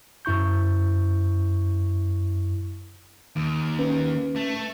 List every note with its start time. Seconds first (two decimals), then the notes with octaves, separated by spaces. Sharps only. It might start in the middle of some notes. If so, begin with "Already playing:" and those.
0.25 F#2 E4 C#6 G6
3.36 D#2
3.79 C#4 B4
4.36 A3